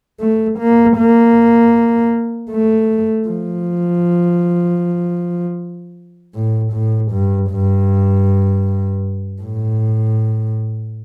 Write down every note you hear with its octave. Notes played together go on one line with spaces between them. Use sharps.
A3
A#3
A#3
A3
F3
A2
A2
G2
G2
A2